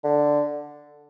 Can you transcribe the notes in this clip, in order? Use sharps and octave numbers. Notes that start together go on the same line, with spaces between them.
D3